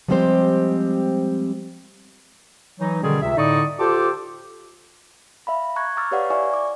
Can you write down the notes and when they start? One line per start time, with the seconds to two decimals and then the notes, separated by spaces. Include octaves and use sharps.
0.08 F3 G3 G#3 C4 G4 C5
2.80 E3 F#3 D#4
3.03 B2 D3 D#3 G3 C#4 G#4
3.22 C#2 C3 G4 E5
3.37 A2 D3 D#4 D5 C#6 D#6
3.80 F4 G4 A4 C5 A5 D6
5.47 E5 F5 B5
5.76 A#5 C#6 F#6 G#6
5.97 A#5 C#6 D6 E6 F6 A6
6.11 G4 B4 C#5 D5 F5 F#5
6.30 E4 D5 E5 G#5 C#6
6.54 D6